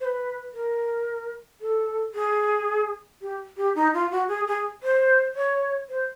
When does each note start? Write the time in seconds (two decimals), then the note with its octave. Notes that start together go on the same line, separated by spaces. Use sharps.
0.01 C5
0.05 B4
0.54 A#4
1.61 A4
2.15 G#4
3.22 G4
3.57 G4
3.75 D#4
3.94 F4
4.11 F#4
4.28 G#4
4.47 G#4
4.83 C5
5.36 C#5
5.89 C5